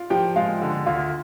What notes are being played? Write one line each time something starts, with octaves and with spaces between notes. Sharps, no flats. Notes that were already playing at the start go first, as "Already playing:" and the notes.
Already playing: F4 F5
F3 G4 G5
G#3 F4 F5
D3
D2 F4 F5